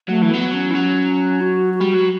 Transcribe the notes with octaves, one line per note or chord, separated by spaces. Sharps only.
F#3 A3
E3
F#3 B3
C#4
E3
F#3
F#4
F#4
G3
F#3